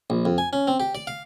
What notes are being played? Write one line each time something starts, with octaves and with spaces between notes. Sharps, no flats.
A#1
F2
G#5
C#4
C4
G4
D5
F5